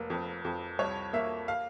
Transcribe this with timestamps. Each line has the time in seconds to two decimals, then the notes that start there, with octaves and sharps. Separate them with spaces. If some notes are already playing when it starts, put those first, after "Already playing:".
Already playing: F1 A#3
0.10 F2
0.45 F2
0.79 C2 C#5
1.13 A#3 E5
1.48 F5